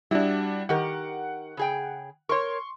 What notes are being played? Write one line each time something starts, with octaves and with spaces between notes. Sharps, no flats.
G3 D4 E4 F#4
D#3 G4 A#4 F#5
C#3 G#4 G5
A#4 C#5 C6 C#6